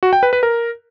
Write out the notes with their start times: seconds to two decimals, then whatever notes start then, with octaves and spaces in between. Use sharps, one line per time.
0.03 F#4
0.13 G5
0.23 B4
0.33 B4
0.43 A#4